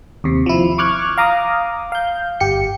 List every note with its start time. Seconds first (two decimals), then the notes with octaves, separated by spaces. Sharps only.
0.24 D#2 C3
0.46 F3 E4
0.78 C#6 D6 F6 F#6 G#6
1.17 F5 A#5 D6 D#6
1.92 F5 G6
2.40 G1 G4 C#7